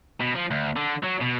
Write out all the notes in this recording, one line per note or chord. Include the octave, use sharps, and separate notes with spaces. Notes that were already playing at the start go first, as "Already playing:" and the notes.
B2
F3
D2
D3
F#3
B2